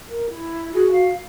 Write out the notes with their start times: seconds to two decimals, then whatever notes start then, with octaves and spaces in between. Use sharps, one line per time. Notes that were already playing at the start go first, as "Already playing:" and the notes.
0.09 A#4
0.30 E4
0.74 F#4 G#4
0.92 F5